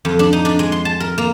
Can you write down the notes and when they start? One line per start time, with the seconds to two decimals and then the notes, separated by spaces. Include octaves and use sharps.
0.05 F2
0.19 D4
0.33 D#4
0.45 D4
0.59 G#3
0.72 C6
0.85 A5
1.00 A#4
1.18 A#3